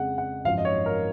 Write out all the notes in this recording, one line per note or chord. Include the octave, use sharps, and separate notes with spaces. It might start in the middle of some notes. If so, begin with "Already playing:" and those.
Already playing: F2 C#3 G#3 F#5
F#5
G#1 F#2 F3 F5
D#5
C#5
A#4